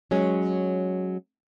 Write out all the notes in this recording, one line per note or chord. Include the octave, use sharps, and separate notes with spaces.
F#3 G#3 C#4